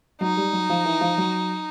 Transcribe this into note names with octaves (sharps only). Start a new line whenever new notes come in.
F#3 D#4
G3
F#3
F3
E3
F3
F#3